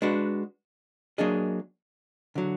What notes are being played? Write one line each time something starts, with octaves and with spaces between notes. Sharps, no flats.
G#3 D4 F#4 B4
F#3 A#3 D4 G#4 D#5
D3 F#3